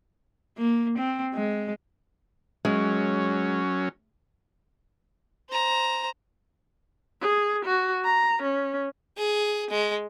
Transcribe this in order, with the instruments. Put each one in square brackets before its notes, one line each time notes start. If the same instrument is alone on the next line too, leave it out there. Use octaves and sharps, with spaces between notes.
[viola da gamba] A#3
C4
G#3
[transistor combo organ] F#3 C#4 [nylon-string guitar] G#3
[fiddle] C5 A#5
[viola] G#4
F#4
A#5
C#4
[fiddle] G#4
G#3